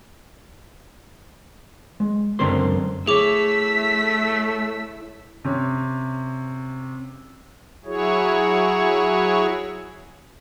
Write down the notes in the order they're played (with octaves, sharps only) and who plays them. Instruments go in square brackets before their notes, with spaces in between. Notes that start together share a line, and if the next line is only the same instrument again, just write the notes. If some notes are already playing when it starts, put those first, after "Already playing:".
[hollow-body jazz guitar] G#3
C#2 F#2 D3 C4 A#4 C6
[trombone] A3 [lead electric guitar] E4 C#5 [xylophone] G#4 D6 [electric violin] E6 B6
[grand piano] C3 C#4
[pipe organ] F#3 E4 F#4 G#4 C#5